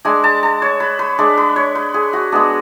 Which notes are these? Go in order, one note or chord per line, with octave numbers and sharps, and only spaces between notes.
G#3 D4 G#5
A5
A5
C#5
B4
B4
G#3 D4
B4
C#5
B4
G#4
F#4
G#3 B3 D4 G#4